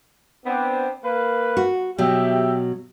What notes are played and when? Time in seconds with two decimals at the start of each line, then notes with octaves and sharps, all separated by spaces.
0.46 B3 C4 D4
1.03 A#3 B4
1.57 F#4
1.98 B2 F#3 G4 E5